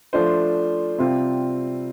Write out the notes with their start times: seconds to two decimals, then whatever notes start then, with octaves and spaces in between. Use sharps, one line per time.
0.13 F3 A3 D4 F4 C5
0.98 C3 G3 C4 F4